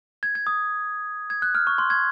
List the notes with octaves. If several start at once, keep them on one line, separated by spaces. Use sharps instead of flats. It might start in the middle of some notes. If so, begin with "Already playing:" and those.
G#6
G#6
D#6
G#6
F#6
F6
C#6
C6
G#6